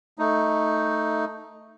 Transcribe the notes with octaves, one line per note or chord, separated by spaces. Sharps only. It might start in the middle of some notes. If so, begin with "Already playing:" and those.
A3 D#4